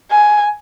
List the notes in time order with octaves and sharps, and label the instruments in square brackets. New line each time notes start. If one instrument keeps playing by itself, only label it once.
[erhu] G#5